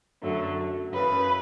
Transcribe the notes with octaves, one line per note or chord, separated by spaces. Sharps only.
F#2 D3 F#3 A3
F#2 C#3 E3 B4